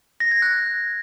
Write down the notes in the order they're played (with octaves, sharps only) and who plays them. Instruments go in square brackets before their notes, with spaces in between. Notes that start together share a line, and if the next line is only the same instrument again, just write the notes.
[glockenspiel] A#6
G#6
F#6